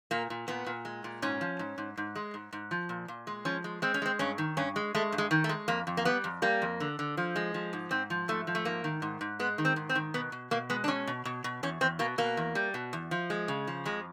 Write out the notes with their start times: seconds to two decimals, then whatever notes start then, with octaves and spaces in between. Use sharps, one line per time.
0.11 A#2 A#3
0.30 A#2
0.48 A#2 B3
0.66 A#2
0.85 G#3
1.04 A#2
1.22 G#2 C#4
1.41 F3
1.59 G#2
1.78 G#2
1.97 G#2
2.16 G#3
2.34 G#2
2.53 G#2
2.71 F3
2.89 A#2
3.08 A#2
3.27 G#3
3.45 F3 C#4
3.64 G#3
3.82 G#3 C4
3.94 C#4
4.02 G#3 C4
4.19 G2 C#4
4.38 D#3
4.57 G2 C#4
4.76 G#3
4.95 G#3 A3
5.12 G2
5.18 G#3
5.31 D#3
5.44 A3
5.49 G#3
5.68 F2 A#3
5.87 F2
5.97 A#3
6.05 G3 B3
6.24 F2
6.42 G3 A#3
6.62 F2
6.80 D3
6.99 D3
7.17 F3
7.36 G#3
7.54 F3
7.73 G#2
7.91 G#2 C4
8.10 F3
8.28 G#2 A3
8.47 F3
8.55 A3
8.65 G#2 A#3
8.84 D#3
9.02 G#2
9.21 G#2
9.39 G#3 B3
9.58 D#3
9.65 C4
9.76 G#2
9.89 C4
9.95 D#3
10.14 B2 B3
10.32 B2
10.51 B2 A#3
10.70 G#3 B3
10.84 D4
10.88 B2 C#4
11.07 B2
11.25 B2
11.44 B2
11.63 E2 C#4
11.81 E2 C4
11.99 B2 A#3
12.18 B2 A#3
12.37 E2
12.55 G3
12.74 B2
12.93 E2
13.11 F3
13.30 G#3
13.48 C#3
13.67 F3
13.85 F2 G#3